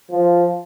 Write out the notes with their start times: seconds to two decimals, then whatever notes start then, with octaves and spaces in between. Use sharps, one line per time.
0.11 F3